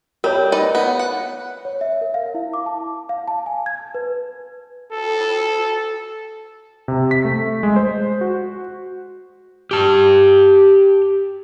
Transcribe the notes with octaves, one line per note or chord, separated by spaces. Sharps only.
G3 A#4 C#5
D#4 B4 D5
B3
F#5
C#5
E5
A#4
F5
E4
D6
A5
F5
A5
G#5
G#6
B4
A4
C3
B6
A3
G#3
C5
F#4
G4 A5